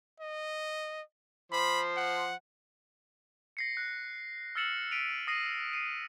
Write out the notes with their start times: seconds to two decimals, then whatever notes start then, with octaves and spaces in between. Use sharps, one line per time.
0.20 D#5
1.52 F3 C5 B5
1.97 F#5
3.57 A#6 C7 C#7
3.77 F#6
4.55 E6 F6 A6 C#7 E7 F#7
4.91 B6 D7 D#7 F7
5.28 D#6 A#6 C7 D#7
5.73 C7 D#7